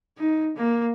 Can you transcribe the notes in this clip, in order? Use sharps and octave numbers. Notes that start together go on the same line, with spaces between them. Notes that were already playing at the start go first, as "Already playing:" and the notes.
D#4
A#3